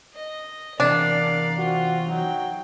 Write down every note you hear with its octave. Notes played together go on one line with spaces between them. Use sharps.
D#5
E2 G2 C3 D4 A#4 D5 F5
C4 F4 F#4
F#3 D#4 G5